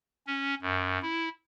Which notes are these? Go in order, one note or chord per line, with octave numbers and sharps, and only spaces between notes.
C#4
F#2
E4